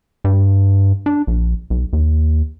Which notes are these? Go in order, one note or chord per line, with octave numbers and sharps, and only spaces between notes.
G2
D4
A#1
B1
D#2